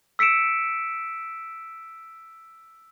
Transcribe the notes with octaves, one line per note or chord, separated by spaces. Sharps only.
E6 B6 C#7 D7 E7